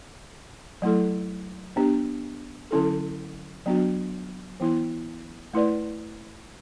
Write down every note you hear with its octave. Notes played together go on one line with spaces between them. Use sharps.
F#3 A3 E4 A4
B3 D4 G4
D3 F#3 C#4 E4 A4
F#3 B3 D4 F#4
E3 B3 E4
A3 E4 B4 D5